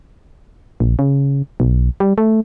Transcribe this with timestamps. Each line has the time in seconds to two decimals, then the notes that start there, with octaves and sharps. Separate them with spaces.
0.80 A#1
0.99 C#3
1.60 B1
2.00 G3
2.18 A3